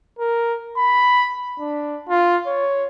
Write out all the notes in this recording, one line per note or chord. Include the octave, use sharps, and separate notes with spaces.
A#4
B5
D4
F4
C#5